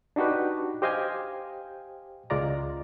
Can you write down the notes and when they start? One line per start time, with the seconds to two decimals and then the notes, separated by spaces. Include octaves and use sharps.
0.16 D4 D#4 F#4 G4 B4
0.82 G4 C5 D#5 F5 G5 G#5
2.30 C#2 G#3 F4 D5 A#5